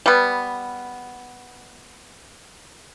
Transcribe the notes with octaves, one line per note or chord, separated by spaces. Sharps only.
G3 B3